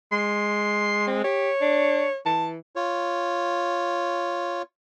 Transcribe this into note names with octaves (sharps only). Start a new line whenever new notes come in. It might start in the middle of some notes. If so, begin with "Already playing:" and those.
G#3 C6
C4
G4 C#5
D4
E3 A5
F4 C#5